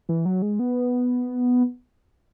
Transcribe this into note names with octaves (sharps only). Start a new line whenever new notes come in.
E3
F#3
G#3
B3